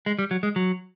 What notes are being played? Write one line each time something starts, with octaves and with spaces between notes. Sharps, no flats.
G#3
G3
F#3
G#3
F#3